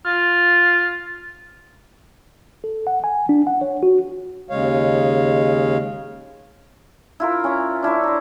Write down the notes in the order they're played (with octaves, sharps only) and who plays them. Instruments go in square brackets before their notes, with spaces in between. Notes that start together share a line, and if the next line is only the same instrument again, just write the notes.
[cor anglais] F4
[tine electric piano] A4
F#5
G#5
D4
F#5
C#5
F#4
[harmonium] D#2 C#3 G#3 C#5 F5
[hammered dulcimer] E4 F4 A#4
C#4 A#5
D4 E4 A#4 C#5
C5 A#5